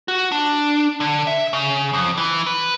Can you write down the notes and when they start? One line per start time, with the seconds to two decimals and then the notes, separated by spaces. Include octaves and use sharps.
0.08 F#4
0.32 D4
1.00 D3
1.27 E5
1.53 C#3
1.93 F2
2.18 E3
2.46 B4